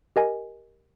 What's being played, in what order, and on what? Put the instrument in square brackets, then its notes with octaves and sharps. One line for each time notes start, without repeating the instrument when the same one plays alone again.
[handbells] G4 A#4 D#5 G#5